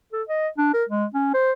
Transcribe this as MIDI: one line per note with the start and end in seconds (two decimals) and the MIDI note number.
0.13 0.23 69
0.29 0.48 75
0.58 0.73 62
0.74 0.84 70
0.89 1.05 56
1.14 1.33 61
1.34 1.52 72